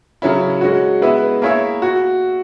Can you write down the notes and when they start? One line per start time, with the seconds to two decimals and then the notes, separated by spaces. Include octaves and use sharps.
0.22 C#3 F#3 C#4 E4
0.61 G#3 C#4 F#4
1.01 G#3 B3 E4 B4 E5
1.42 A#3 E4 G#4 C#5 E5
1.82 F#4